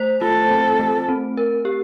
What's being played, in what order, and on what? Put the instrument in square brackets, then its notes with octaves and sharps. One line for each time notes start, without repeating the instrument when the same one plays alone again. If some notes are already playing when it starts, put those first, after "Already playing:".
Already playing: [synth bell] A3 C5
[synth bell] F4 [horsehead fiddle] A4
[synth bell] C4
A3
C4
A#4
G4